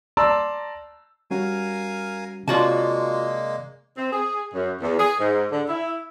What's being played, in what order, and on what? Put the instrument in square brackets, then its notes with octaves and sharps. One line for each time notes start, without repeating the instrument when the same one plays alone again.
[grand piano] D5 A5 A#5 C6 E6
[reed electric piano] G3 C#4 F#4 [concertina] A#4 F5 G#5
[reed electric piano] C3 C#5 D5 [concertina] G#3 A#3 [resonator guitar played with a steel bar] F4 F#4 A5
[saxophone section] C4
G#4
F#2
E2
G#4
G#2
D3
E4